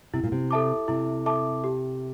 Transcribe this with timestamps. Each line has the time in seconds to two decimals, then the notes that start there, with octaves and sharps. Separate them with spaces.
0.14 C3 E4
0.24 A#2
0.32 C3
0.51 A4 E5 A5 D6
0.88 C3 E4
1.26 A4 E5 A5 D6
1.64 G4